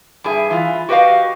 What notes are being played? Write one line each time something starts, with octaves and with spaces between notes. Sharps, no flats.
G2 G#4 E5
E3 F4
F#4 G4 B4 C5 D#5 F5